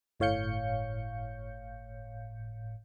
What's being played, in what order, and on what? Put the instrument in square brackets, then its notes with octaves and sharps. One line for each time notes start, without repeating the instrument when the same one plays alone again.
[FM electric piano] G1 A2 C#5 F5 G6 C#7